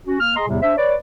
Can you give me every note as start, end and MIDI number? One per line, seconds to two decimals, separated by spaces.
0.07 0.19 61
0.07 0.19 66
0.21 0.34 58
0.21 0.34 89
0.36 0.48 68
0.36 0.48 75
0.36 0.48 82
0.36 0.48 84
0.48 0.60 40
0.48 0.60 45
0.48 0.60 48
0.48 0.60 55
0.62 0.73 62
0.62 0.73 72
0.62 0.73 76
0.77 0.95 71
0.77 0.95 73
0.77 0.95 74